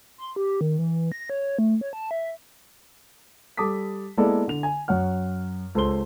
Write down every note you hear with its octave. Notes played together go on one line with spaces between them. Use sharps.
C6
G4
D#3
E3
A#6
C#5
A3
C#5
A5
E5
G3 A4 A5 D6 D#6 B6
G#3 A#3 B3 E4 A4 D5
D3 F7
G#5
F#2 C#5 F#5 F6
C#2 A4 C5 C6 G7